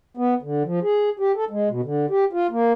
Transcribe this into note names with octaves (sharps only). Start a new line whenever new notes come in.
B3
D3
F3
G#4
G4
A4
G#3
B2
D3
G4
F4
A#3